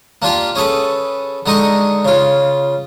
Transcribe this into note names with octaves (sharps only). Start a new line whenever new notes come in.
A#3 D4 F4 G4
C#4 G#4 A4 B4
D3 G#3 D#4 D#5 C#6
C#3 F4